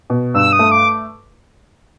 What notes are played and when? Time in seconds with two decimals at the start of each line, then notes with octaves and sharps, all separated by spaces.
0.10 B2
0.34 G2 E6
0.53 D#6
0.59 A3
0.71 D6